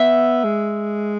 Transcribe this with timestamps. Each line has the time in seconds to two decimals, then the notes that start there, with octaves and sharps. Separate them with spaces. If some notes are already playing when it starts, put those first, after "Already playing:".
Already playing: B3 E5
0.44 G#3